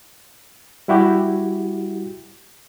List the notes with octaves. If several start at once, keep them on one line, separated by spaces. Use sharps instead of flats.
G3 E4 F#4 G4